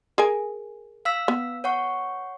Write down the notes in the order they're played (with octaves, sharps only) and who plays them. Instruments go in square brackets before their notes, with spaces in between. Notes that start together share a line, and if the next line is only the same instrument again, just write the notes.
[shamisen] G#4 A#4 G#5
[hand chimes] F5 E6 B6
[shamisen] B3
[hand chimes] C#5 F#5 C#6